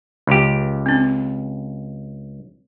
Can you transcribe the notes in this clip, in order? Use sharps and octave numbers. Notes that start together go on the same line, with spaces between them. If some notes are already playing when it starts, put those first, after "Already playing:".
C#2 G4
C4 C#4